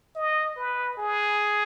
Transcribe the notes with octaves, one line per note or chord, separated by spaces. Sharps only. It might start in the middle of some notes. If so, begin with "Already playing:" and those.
D#5
B4
G#4